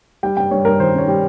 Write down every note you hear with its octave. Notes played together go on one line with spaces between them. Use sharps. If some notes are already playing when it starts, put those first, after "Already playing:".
G3 G5
G2 G5
G2 C#5
G2 A#4
D#3 C5
C#4 C#5
G3